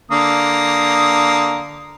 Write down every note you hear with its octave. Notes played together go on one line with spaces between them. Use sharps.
D3 A#3 D#6